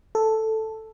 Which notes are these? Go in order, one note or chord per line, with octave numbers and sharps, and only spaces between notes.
A4